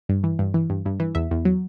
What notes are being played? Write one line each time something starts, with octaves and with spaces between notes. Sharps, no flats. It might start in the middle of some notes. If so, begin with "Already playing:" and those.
G2
E3
G2
E3
G2
G2
E3
E2 E5
E2
F#3